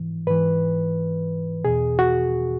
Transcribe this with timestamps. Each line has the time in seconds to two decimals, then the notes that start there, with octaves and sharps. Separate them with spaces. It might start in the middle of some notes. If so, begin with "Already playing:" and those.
Already playing: G#2 E3
0.27 G#2 E3 B4
1.64 E2 B2 G#4
1.99 F#4